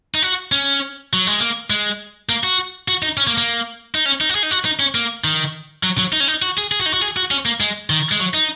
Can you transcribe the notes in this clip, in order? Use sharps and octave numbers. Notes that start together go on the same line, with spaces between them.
D#4
F#4
C#4
F#3
G#3
A#3
G#3
A#3
F#4
F#4
D#4
C#4
A#3
A#3
D#4
C#4
D#4
F#4
G#4
D#4
F#4
D#4
C#4
A#3
D#3
F#3
F#3
D#4
C#4
D#4
F#4
G#4
G#4
F#4
D#4
F#4
G#4
F#4
C#4
A#3
G#3
D#3
G#3
F#3
D#4